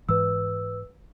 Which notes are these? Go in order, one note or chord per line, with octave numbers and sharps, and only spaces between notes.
G#2 E3 B4 E6